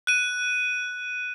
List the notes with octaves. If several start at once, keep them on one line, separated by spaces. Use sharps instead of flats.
F#6 D#7